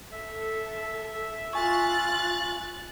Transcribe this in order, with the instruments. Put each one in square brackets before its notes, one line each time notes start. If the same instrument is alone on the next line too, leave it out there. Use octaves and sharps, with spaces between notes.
[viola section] A4 [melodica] E5
[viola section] F4 [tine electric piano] G#5 C#6 [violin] F#6 A6